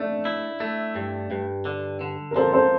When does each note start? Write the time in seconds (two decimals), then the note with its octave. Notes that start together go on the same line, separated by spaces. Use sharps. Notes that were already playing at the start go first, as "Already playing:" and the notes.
Already playing: A3 D4
0.25 E4
0.60 A3
0.95 G2
1.31 G2
1.65 D3
2.01 D3
2.31 A#4
2.35 F3 A4 C5
2.53 A4 C5